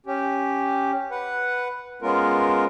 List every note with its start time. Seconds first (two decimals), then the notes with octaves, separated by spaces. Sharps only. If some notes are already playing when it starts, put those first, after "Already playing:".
0.06 C#4 G4
1.11 B4 F#5
2.02 G#3 B3 C#4 F4 A#4